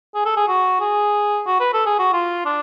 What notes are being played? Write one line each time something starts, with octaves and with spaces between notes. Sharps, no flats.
G#4
A4
G#4
F#4
G#4
F#4
B4
A4
G#4
F#4
F4
D4